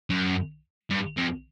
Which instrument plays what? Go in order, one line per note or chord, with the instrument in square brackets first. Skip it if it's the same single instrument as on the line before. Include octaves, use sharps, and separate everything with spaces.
[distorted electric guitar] F#2
G2
F2